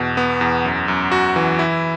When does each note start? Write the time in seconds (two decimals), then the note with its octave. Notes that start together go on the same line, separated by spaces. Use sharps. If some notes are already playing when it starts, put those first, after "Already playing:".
Already playing: E2 B2
0.17 B3
0.41 E2
0.65 F#2
0.88 F#2
1.12 F#4
1.36 E3
1.59 E4